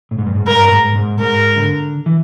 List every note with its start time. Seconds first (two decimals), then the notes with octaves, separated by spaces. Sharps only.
0.11 A2
0.18 G#2
0.26 G2
0.35 G#2
0.47 G2 A#4
0.72 G#2
0.95 G#2
1.20 G#2 A#4
1.56 D3
2.06 E3